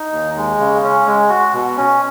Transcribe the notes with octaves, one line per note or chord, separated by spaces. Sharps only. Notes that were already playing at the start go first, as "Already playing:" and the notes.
Already playing: D#4
D#2
G#3
C#3
C#4
G#3
F#4
B2
C#4